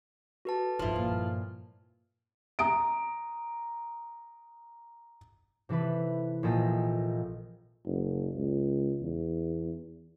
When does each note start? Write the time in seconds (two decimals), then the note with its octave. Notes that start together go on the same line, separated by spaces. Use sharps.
0.45 F#4 A4 B4 A5
0.79 A1 G2 F3 E4 F6
0.95 G2 A#2
2.59 A#5 D#6 D7
5.69 C3 E3 A4 B4
6.43 A#1 A#2 A4 D#5 G5
7.86 F#1
8.36 C#2
9.02 E2